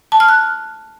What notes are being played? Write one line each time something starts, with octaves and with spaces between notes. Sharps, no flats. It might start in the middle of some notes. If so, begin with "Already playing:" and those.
A5
F6
F#6